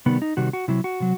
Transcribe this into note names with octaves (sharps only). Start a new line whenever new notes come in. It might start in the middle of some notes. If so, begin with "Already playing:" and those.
C3 D#3 G3 B3
D#4
C3 D#3 G3 F#4
F#4
C3 F#3 E4
F#4
C3 F#3